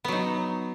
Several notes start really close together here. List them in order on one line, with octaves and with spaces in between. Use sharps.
B3 F#3 D#4